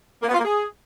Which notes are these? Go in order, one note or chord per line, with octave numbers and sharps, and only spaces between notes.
A#3
B3
F4
A#3
G#4